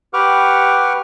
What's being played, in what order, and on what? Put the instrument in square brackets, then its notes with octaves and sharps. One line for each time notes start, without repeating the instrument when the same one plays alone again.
[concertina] G4 B4 F#5 C#6 D6 F6